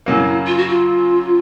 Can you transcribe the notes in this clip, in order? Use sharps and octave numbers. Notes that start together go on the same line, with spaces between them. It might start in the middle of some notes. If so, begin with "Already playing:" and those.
F#2 C#3 F#3 A#3 E4
F4
F#4
F4